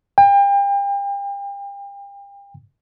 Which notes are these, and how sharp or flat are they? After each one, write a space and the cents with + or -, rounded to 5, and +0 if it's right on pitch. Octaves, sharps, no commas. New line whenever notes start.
G5 +35